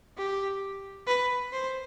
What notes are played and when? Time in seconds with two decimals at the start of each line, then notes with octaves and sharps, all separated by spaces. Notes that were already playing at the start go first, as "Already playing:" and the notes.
0.17 G4
1.07 B4
1.53 C5